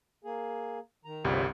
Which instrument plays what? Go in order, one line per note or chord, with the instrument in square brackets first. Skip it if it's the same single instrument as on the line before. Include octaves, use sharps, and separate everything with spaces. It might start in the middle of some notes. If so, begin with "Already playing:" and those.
[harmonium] A#3 G#4
D#3 A#5
[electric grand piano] G1 C2 G3 [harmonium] C#3 F3